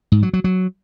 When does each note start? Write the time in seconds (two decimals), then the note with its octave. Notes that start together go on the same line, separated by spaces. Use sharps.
0.12 G#2
0.23 F#3
0.33 F#3
0.44 F#3